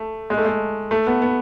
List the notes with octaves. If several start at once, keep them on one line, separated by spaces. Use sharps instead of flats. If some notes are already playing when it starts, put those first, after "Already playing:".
Already playing: A3
G#3
A3
G#3
A3
B3
B3